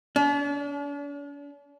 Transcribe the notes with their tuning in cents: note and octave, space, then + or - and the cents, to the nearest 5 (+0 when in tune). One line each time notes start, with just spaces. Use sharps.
D4 -45